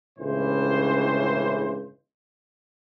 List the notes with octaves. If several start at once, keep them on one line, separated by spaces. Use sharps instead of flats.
G1 C#2 A2 C#3 E3 C5